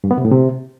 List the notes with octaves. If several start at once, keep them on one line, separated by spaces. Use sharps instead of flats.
G2
B3
C3
A2
C3